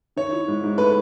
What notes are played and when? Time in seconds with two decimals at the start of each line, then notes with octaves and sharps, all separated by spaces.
0.16 D#3 C#5
0.32 E4
0.48 G#2
0.63 G#2
0.78 A3 B4